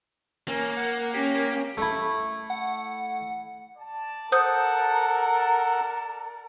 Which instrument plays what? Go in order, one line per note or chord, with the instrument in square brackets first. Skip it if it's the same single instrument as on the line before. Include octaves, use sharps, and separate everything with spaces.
[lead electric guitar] A#3 [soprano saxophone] C#4
[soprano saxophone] F#5
[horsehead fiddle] C#4 [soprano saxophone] G4
[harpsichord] A3 E4
[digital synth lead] F#5
[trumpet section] D5 A5
[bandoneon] A4 F#5 [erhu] A#4 [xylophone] C5 D#6 G6